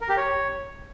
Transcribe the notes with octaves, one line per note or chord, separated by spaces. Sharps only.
A#4
G4
C#5